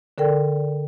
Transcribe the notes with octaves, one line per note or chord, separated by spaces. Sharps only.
D3 A4 A#4 D5 G5